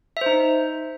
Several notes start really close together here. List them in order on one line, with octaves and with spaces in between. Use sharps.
E5 C5 D#4